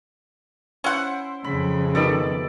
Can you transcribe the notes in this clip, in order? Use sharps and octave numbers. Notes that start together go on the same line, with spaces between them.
C#4 E4 C5 F#5
F2 C#3 B5
B2 D#3 A3 A4 D5 B5